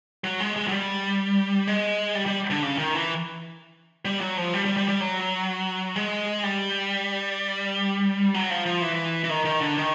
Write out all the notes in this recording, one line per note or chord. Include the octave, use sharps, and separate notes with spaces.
F#3
G#3
G#3
F#3
G3
G#3
G3
G3
D3
C#3
D#3
E3
G3
F#3
F3
G3
G3
G3
G3
F#3
G#3
G3
F#3
F3
F3
E3
E3
D#3
D#3
D3
D#3